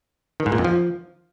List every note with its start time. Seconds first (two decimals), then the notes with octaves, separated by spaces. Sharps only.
0.40 D#3
0.46 G#2
0.52 A#2
0.58 F2
0.65 F3